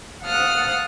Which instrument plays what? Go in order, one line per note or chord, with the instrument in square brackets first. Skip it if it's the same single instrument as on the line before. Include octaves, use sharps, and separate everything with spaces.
[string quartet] F5 F#5 A5 D#6 F6 F#6